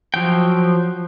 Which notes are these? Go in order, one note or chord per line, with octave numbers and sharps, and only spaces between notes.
F3 F#3 G5